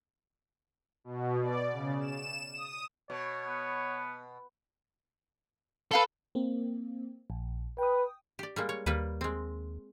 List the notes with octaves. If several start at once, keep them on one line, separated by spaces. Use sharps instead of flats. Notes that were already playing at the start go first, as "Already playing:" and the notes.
B2
D5
C#3
E7
D#6
B2 C#5
B3
A4 B4 F5 B5
A#3 C4
A#1
B4 G5 D#6
G4 D5
G3 G#3 A#3
C#5
D#2 G3 A#3 B4
G#3 C4